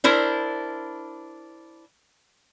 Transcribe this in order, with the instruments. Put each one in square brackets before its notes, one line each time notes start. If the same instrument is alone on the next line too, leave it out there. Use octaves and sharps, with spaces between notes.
[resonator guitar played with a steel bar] D4 E4 A#4 C5